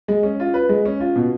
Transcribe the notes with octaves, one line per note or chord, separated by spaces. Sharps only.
G#3
C#4
F4
B4
G#3
C#4
F4
B2